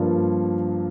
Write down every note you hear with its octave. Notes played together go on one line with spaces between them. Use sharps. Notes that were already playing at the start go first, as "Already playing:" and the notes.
Already playing: G2 F3 A#3 F4